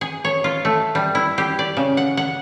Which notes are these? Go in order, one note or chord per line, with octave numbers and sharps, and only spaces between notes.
G#4
C#5
F4
A3
G3
E4
G4
D5
C#3
F#5
F#5